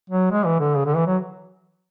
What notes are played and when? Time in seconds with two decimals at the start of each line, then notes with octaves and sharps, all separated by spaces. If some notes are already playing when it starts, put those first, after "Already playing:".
0.10 F#3
0.31 G#3
0.46 E3
0.60 D3
0.75 C#3
0.85 D3
0.96 E3
1.07 F#3